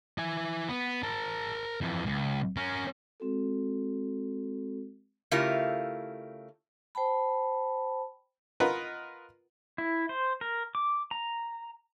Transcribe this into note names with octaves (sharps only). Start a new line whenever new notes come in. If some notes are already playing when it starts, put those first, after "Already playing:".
E4 G#5
B3
A#4 A5
F2 E3
C#2
C#4 A#4
G#3 C4 F#4 A4
C#3 A3 E4 F4 G4 A#4
C5 G5 A5 B5
F4 A#4 B4 D#5 F#5
E4
C5
A#4
D6
A#5